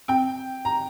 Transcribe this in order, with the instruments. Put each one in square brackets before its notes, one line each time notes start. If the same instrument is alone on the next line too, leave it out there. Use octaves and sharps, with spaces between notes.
[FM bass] C4 [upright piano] G5
[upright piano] A#5